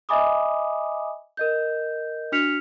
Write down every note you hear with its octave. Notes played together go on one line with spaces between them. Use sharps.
D#5 E5 G#5 B5 D6 D#6
A#4 D#5 G6
D4 F#4 F6 B6 C#7 F7